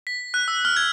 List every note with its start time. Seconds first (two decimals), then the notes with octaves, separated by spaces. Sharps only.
0.07 B6
0.34 F#6
0.48 E6
0.65 F6
0.76 G#6